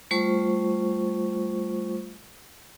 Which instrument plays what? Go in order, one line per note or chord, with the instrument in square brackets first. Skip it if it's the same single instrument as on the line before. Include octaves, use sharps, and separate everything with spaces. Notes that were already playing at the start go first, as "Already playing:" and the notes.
[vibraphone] G3 A3 F4 C5 C#6